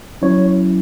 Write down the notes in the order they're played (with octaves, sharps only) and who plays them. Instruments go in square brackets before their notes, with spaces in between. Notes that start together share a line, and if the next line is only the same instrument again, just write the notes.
[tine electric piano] F#3 C#4 E4 C#5